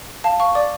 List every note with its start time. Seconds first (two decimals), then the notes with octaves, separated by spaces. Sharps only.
0.24 F5 A5
0.40 F5 C#6
0.55 D5 D6